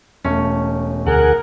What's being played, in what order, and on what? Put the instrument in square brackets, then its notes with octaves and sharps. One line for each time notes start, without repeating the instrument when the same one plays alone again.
[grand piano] E1 A3 A4 [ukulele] C#4
[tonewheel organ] D2 G#4 F#5 [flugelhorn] A#4